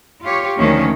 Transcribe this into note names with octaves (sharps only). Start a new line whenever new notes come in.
F4 G4 C#5
D2 D#3 F3 A#3 C#4